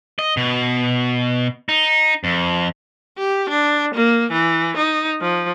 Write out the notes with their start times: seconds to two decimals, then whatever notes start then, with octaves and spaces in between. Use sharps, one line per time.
0.19 D#5
0.37 B2
1.69 D#4
2.24 F2
3.18 G4
3.50 D4
3.95 A#3
4.32 E3
4.77 D#4
5.21 F3